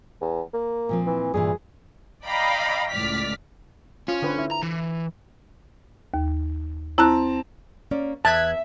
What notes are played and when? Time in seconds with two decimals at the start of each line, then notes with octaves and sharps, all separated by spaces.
0.21 E2
0.53 A#3
0.89 A#2 F3 C4
1.06 E3
1.34 G2 A#2 E3 G#4
2.25 D5 D#5 F5 G5 A#5 B5
2.92 C#2 A2 D5 F6 B6
4.08 C#4 F4
4.22 D3 B4 C5
4.38 E4
4.51 A#5
4.63 E3
6.14 D#2
6.98 C4 E4 A5 A#5 F#6
7.91 A#3 C#4 D5
8.25 E2 E5 A5 F#6 G#6 B6